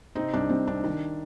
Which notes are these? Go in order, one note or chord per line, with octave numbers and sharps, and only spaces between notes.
C3 C4 D#4
C2 D4
C2 C4
C2 D4
D#3 D4